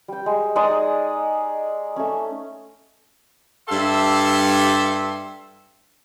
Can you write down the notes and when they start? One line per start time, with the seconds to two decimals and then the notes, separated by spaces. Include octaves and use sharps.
0.08 G3 G5
0.26 G#3
0.56 G#3 D#4 D5 D#6
1.96 A3 C#4
3.68 G2 G4 A4 E5 C6